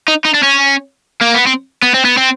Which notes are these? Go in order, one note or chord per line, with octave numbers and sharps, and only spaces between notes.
D#4
D#4
D4
C#4
A#3
B3
C4
B3
C4
B3
C4